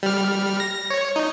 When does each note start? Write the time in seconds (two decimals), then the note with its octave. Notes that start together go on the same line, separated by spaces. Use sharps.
0.03 G3 F6
0.60 A#6
0.90 C#5
1.16 D#4